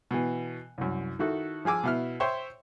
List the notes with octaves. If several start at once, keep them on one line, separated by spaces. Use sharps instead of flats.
B2 E3
C2 F#2
D#3 E4 F#4 A4
F3 G#4 G#5 D6 E6
B2 E4 F6
C5 C#5 E5 G5 C6 C#6